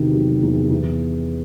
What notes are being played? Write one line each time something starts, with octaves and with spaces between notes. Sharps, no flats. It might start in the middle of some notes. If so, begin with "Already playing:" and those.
Already playing: E2 C3 D#3 F#3
F#3
E2
E2